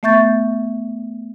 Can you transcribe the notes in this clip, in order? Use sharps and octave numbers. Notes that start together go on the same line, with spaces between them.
A3 B3 E5 C#6 G6 A6